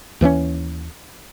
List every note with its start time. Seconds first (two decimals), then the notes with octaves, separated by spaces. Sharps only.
0.21 D#2 E3 F3 C#4